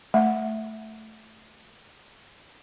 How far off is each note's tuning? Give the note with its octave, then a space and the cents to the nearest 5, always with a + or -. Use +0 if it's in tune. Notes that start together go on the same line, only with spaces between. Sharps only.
A3 +0 E5 +0